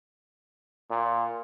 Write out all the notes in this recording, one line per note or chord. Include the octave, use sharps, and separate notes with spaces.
A#2